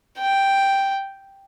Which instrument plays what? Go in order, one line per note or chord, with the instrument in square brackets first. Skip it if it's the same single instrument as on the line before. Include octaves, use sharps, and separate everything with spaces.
[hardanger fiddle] G5